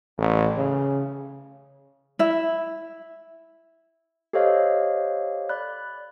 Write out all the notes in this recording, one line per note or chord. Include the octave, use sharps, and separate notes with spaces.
A1
C#3
E4 E5
G4 A4 C5 C#5 D#5 F5
D5 B5 F#6